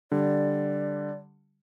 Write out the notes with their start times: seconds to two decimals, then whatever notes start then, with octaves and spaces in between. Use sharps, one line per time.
0.12 D3 G3 D5